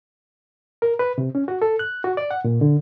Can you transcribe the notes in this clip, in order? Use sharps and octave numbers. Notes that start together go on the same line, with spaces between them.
A#4
B4
C3
C#4
F#4
A4
F#6
F#4
D5
F#5
A#2
D3